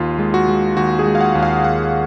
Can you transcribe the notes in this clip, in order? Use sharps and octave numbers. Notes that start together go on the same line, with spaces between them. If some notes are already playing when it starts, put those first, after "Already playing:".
Already playing: D#2 F4
G#3
F#4
G#3
D#2 F#4
G#4
G#3
F5
F#5
D#2
F5
D#2 F#5